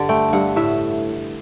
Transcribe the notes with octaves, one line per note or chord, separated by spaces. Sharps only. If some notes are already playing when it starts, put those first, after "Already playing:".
Already playing: G2 D3 D5
A3 G5
G2 F#5
A2 E5